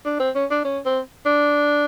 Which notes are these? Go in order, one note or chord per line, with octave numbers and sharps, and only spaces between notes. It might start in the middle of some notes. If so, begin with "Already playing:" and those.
D4
C4
C#4
D4
C#4
C4
D4